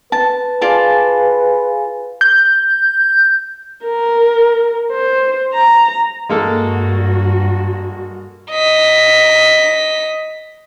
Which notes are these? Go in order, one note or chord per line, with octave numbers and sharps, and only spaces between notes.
B4 A5
F4 G#4 D5 F5 G#5 A5
G6
A#4
C5
A#5
G2 G#3 A#3 F#4 A4
D#5 B6